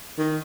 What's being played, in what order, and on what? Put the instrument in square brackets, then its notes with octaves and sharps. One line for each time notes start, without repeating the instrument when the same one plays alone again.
[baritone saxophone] D#3